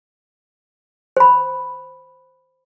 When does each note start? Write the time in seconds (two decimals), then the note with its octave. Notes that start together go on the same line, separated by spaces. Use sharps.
1.17 C5 B5